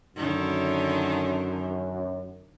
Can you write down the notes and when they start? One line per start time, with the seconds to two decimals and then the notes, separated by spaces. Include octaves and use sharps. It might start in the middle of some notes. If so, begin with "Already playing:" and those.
0.16 F#2 D3 D#3